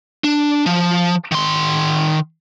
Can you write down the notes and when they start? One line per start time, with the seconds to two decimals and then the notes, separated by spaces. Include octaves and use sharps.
0.24 D4
0.66 F3
1.32 D#3 C6